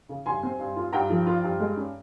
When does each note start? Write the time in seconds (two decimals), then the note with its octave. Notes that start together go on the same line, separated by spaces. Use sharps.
0.09 C#3
0.26 G2 G#5 C6
0.43 C4
0.59 G2
0.76 F4
0.93 G2 G5 A#5
1.10 F3
1.26 F4
1.43 G2
1.60 G#3
1.77 C#4